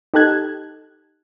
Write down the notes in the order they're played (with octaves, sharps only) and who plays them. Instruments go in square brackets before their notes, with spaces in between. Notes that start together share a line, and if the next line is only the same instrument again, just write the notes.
[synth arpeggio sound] D#4 G4 A4 A5 F#6 G#6